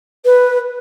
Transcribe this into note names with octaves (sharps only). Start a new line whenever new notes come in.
B4